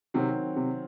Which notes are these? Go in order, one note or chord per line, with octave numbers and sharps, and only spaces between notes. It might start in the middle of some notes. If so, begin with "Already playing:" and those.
C3 D#3 F#3 C4
C3